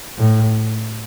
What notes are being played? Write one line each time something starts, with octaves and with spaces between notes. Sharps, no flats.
A2